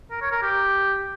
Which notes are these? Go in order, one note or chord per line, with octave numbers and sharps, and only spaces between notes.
A#4
C#5
A#4
G4